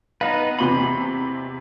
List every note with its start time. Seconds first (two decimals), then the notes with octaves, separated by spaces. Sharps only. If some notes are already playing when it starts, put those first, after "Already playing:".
0.21 B3 D#4 B4 F5
0.59 E2 C3 E3 B5 C6